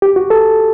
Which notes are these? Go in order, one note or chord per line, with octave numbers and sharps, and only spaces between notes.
G4
F#4
A4